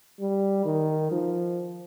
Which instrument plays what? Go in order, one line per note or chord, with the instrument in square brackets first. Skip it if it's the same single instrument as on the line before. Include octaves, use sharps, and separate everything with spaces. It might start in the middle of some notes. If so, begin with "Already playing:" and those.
[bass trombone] G3
D#3
F3